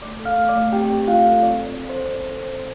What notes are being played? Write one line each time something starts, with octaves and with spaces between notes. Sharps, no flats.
A3 D5 D6
A4
F5 F6
A3
D5 D6
A3
C4 G4 G5
C4
A3 F4 F5
A4
C4 D5
C4
D5
A4
C5
A4
C4 D5
A4
C5
C4